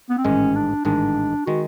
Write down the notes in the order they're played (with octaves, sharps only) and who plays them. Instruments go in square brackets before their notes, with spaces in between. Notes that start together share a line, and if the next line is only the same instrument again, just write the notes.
[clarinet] B3
C4
[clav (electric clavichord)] A1 G#2 D#3 G#3 [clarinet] C#4
[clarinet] D4
[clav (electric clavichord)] A1 G#2 D#3 G#3 [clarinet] D4
[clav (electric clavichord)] D#3 G#3 [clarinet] F#4